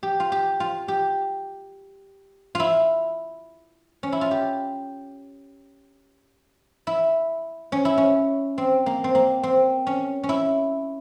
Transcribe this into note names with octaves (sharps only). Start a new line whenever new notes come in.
G4
F4
G4
F4
G4
E4 F4
C#4
E4
F4
G4
E4
C#4
E4
C#4
C4
A#3
C4
A#3
C4
C#4
C#4
E4